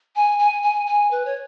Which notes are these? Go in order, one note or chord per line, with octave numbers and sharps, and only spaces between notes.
G#5
G#5
G#5
G#5
B4
C#5